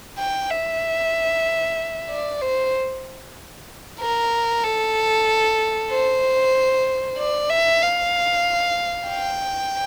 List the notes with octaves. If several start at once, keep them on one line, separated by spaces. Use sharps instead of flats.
G5
E5
D5
C5
A#4
A4
C5
D5
E5
F5
G5